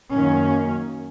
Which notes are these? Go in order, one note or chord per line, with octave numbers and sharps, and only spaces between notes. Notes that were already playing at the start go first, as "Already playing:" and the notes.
F#2 D#3 A#3 C#4